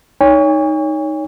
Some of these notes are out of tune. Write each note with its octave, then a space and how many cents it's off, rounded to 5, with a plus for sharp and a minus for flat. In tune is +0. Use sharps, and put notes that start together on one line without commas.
D#4 +0 C#5 +25 G#5 -40